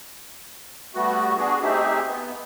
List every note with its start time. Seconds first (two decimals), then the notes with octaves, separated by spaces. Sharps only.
0.95 G3 A3 B3 F#4
1.38 B3 D4 F#4 G#4
1.62 A3 C4 D#4 G4 G#4 E5
2.07 B3